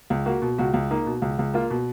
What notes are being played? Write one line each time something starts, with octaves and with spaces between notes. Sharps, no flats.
C#2
A#3 F#4
B2
C#2 F#4
C#2
A#3 D#4
B2
C#2
C#2
A#3 F4
B2